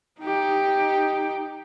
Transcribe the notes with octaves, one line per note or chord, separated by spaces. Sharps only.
D#4 G4